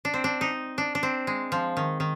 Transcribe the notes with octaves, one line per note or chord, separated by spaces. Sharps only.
D4
C4
D4
D#4
D4
D4
C4
G#3
F3
D#3
D#3